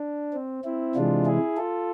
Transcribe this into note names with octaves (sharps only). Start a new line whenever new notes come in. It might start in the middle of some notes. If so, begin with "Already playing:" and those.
Already playing: D4
C4
C4 E4
C3 E3 G#3 D4 F4
E4 G#4
F4 A4